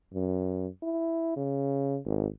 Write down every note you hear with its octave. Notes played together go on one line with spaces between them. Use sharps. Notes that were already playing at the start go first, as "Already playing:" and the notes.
F#2
E4
C#3
G#1